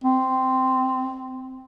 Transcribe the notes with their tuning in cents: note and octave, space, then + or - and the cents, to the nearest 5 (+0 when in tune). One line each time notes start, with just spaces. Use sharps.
C4 -10